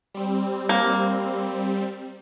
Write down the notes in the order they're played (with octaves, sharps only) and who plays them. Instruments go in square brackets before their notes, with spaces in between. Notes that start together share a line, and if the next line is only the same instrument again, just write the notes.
[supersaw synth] G3 C4
[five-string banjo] A#3